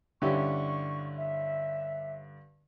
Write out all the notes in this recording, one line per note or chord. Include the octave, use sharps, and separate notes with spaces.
G2 D3 C#4 E4 G4 C#6
E5